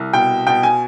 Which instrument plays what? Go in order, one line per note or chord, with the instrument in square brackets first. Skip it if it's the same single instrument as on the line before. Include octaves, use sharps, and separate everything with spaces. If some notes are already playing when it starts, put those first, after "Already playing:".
Already playing: [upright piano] C2
B2 G5
B2 G5
G#5